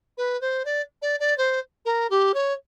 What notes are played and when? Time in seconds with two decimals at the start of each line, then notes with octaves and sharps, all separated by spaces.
0.17 B4
0.41 C5
0.65 D5
1.02 D5
1.19 D5
1.37 C5
1.85 A#4
2.10 G4
2.34 C#5